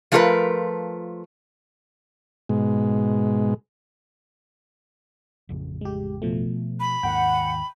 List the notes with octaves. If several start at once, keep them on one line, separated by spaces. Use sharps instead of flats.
F3 A3 F4 F#4 A#4 B4
G#2 B2 G#3
A1 F2 C#3
G#3 G4
B2 F3 A3
B5
D#2 G#2 D#3 F#5 G5